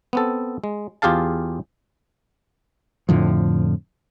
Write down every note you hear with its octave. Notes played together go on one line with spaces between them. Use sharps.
B3 C4 A4
G#3
E2 F4 G4 G#4 F5 A5
F2 A2 D3 F3